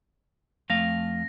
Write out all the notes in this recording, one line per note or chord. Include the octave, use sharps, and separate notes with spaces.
F2 A3 F5 A#6